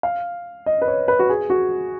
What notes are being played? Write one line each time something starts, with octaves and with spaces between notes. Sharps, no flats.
F5
D#5
B4
C#5
B4
F#4
G#4
F#4